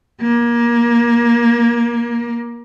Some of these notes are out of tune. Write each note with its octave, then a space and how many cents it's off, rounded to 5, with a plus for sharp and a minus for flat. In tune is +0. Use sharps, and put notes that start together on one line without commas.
A#3 +20